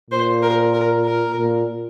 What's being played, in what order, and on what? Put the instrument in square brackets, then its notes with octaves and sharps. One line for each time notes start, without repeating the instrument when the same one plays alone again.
[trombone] A#2 [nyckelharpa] C5
[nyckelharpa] A#4
A#4
A#4
[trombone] A#2